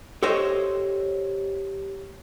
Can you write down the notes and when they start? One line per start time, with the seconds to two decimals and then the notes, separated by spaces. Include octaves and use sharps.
0.23 G4 A4 C5 C#5 D#5 E5